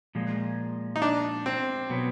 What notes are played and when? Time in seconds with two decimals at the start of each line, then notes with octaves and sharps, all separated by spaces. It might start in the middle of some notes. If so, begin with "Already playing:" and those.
0.15 A#2 F3 G#3
0.96 D#4
1.02 D4
1.46 C4
1.89 B2 F#3 B3